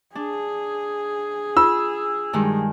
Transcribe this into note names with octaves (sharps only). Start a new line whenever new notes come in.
D4 G#4
F4 E6
G2 D#3 G#3